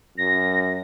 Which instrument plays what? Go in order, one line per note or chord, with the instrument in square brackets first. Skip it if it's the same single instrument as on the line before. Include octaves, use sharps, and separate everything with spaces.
[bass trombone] F#2 [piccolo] A#6